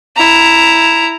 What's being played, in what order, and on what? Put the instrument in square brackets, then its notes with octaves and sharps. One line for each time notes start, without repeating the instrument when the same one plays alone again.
[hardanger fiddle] E4 A#5